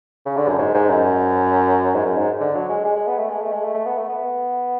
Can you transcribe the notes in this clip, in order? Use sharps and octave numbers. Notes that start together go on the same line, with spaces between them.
C#3
D3
F#2
G#2
G#2
F#2
G#2
F#2
G#2
D3
F#3
G#3
G#3
G#3
B3
A3
G#3
A3
G#3
A3
A3
B3
A3
B3